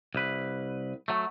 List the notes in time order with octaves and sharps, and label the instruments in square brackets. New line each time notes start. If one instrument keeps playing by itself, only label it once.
[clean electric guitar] C2 B4
F#3 A3